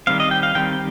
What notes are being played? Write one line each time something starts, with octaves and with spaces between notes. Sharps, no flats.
D#3 G3 C4 F5
D#5
G5
F5
D#3 G3 C4 G5